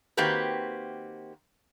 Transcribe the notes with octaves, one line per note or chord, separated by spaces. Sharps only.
D#3 A#3 C4 F#4 G4 B4